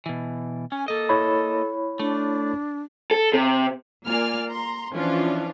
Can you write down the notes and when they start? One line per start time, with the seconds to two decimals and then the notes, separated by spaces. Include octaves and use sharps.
0.06 B2 E3
0.72 C#4 G#5
0.88 A#3 A4 D#5
1.09 E4 C#5 B5
1.99 A3 D4
3.11 A4
3.34 C3
4.05 A#3 F4 D5 G#5 F6
4.48 A#5 C6
4.95 E3 F3 C#4 D4 F4